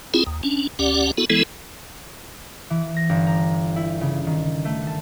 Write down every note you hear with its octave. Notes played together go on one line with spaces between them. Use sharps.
C4 E4 F4 G#4
D#2
C#4 D4
D2 C#4 G4 D5 F#5
B3 E4 F#4 A4
E3 G#3 B3 E4 A4
E3
A#6
G1
A#5
E4
C#3
D#3
A3
A5